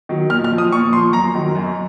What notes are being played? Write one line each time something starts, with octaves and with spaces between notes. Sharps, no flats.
D#3 F#3
A#2 F6
F6
F3
D#6
A#2 C#6
F3 C6
F#2 A#5
D#3 F#3
F#2